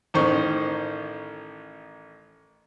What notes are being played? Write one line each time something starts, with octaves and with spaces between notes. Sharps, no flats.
A1 D#3 C5 C#6